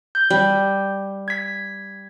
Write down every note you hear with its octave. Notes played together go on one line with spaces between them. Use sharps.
G6
G3
G#6 B6